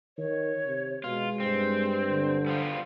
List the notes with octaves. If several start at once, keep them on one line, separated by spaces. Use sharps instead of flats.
D#3 C#5
C3
B2 G#3 F4
G2 C4 C5
D3
G3 B3 F4